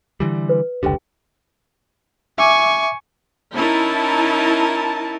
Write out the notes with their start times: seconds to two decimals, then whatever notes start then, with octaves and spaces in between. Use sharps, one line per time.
0.20 D3 E3 G3
0.49 B4
0.83 F1 C#2 D3 G4 G5
2.38 E5 G#5 C#6 D6
3.55 C#4 D#4 E4 A#4 A5